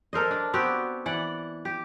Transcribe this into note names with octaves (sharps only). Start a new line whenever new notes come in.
A4 A#4 C5 D#5
D4
B3 C4 F#4 G4
E3 D5 F#5
G4